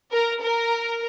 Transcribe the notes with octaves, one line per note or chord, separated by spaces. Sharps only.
A#4
A#4